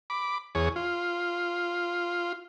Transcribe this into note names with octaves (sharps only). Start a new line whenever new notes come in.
B5 D6
E2 G#4 C#5
F4